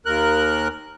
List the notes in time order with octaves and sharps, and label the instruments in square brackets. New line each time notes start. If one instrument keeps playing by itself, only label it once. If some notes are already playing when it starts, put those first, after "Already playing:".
[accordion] D#2 A#4 F#6